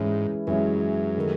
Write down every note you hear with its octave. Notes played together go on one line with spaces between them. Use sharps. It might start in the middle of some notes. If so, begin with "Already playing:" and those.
Already playing: G#2 E3 G#3 C#4 E4
F#2 E3 G#3 C#4 E4
D#3 A3 D#4 G#4